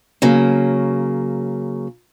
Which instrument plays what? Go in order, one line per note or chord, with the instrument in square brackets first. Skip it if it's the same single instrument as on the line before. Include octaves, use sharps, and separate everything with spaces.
[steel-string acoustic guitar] C#3 F#3 A#3